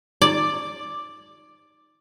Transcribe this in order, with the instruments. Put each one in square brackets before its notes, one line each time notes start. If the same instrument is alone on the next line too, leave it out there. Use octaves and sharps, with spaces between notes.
[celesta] D#4 D6 [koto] D5